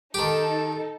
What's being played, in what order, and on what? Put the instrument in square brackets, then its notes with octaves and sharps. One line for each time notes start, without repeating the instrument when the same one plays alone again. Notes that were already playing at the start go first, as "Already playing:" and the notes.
[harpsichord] D#3 G4 [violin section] D#4 A4